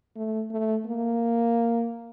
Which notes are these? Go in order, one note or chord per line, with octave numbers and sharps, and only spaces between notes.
A3
A3
A#3